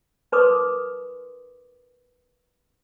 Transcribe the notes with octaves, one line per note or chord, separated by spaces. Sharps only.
D#4 A#4 B4 C6 D6 D#6